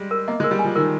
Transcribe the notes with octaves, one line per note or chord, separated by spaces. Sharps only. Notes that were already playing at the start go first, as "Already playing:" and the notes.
Already playing: G3 G#3
A#4
A#3 D#5
G#3
A#4
G3
G#5
F3
D#3 A#4